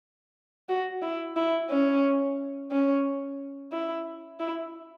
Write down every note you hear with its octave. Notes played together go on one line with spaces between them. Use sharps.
F#4
E4
E4
C#4
C#4
E4
E4